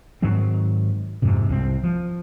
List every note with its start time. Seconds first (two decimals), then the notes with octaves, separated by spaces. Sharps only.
0.22 G#2 D#3 F#3 C4
1.22 F2 G#2 C3
1.49 C2 C4
1.83 F3